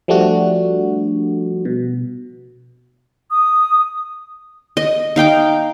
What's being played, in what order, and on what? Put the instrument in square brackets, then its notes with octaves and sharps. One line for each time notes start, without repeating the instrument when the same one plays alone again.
[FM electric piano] F3 G3 A3 D4 F#4
B2
[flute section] D#6
[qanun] D#5
D#4 F5 G5 D6